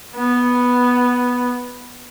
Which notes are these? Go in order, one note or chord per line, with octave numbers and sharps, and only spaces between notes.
B3